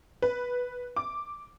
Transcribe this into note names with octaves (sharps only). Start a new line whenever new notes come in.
B4
D6